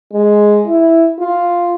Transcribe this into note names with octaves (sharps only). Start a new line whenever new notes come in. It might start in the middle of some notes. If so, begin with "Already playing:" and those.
G#3
E4
F4